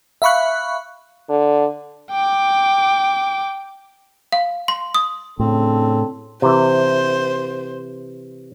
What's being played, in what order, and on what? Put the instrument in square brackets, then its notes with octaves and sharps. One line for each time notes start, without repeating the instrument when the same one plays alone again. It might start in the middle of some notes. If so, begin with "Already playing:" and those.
[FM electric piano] E5 F5 B5 C#6 F#6
[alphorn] D3
[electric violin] G5 D6
[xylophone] F5
C6
D#6
[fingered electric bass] A2 [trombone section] C#3 D4 A4 [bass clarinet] C4
[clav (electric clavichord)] C3 E3 [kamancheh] C5